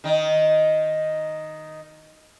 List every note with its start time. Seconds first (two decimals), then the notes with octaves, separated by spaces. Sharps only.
0.04 D#3 D#4